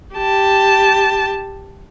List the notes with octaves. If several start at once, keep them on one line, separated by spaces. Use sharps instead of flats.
G4 A5